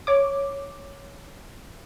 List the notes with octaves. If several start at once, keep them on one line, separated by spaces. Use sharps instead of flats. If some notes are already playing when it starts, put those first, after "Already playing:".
C#5 D6